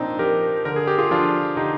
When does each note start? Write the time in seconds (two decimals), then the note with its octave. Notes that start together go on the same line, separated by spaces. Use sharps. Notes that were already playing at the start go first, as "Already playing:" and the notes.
Already playing: A#2 F3 C4 D4 D#4
0.19 F3 G4 A#4
0.65 D3 A#4
0.76 G#4
0.87 G4
0.98 F4 G#4
1.11 F3 D4 F4
1.57 D3 D#4 G4